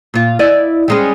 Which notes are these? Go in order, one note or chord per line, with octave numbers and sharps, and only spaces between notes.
A#2 F4
E4 D5 D#5
G3 G#3 C#4